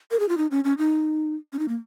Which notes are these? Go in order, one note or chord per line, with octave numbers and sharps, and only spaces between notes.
A#4
G#4
F4
D#4
C#4
C#4
D#4
C#4
D#4
A#3